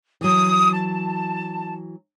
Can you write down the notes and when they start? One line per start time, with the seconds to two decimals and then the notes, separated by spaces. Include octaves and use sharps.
0.21 E3 F#3 D#6
0.74 A5